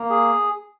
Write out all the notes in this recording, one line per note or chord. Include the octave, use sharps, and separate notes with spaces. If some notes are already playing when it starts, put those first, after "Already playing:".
Already playing: A#3
G#4